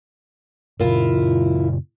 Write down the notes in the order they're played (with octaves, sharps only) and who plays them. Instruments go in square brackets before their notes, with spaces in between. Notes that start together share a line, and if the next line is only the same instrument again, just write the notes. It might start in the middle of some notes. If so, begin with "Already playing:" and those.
[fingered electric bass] F#2 A#2 C#3 [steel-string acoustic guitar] E4 F4 A#4